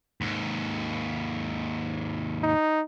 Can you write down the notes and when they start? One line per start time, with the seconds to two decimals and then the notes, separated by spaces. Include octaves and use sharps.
0.21 D#2 G#2
2.43 D#4